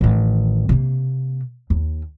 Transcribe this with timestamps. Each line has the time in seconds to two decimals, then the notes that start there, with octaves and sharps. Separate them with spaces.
0.01 A1 D#3
0.69 C3 A#3
1.70 D#2